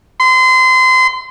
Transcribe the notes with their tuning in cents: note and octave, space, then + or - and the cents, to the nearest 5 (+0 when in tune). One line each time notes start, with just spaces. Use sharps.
C6 -30